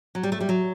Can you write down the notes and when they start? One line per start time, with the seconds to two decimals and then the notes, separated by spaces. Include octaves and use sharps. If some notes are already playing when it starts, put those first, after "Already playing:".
0.15 F#3
0.23 G3
0.32 A3
0.41 G3
0.49 F#3